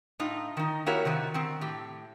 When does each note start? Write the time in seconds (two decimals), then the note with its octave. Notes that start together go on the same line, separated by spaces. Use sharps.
0.20 A2 D#4 F4
0.57 D#3 D#4
0.86 A#3 E4 F#4 G4 A#4 C#5
1.05 C3 D#3 F#4
1.34 D#3 C4
1.61 A2 G4